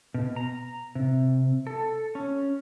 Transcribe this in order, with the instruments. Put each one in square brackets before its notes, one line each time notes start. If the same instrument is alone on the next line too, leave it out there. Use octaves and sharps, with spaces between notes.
[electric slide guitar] B2
A#5
C3
A4
C#4